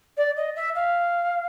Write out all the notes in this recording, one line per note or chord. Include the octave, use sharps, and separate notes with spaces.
D5
D#5
E5
F5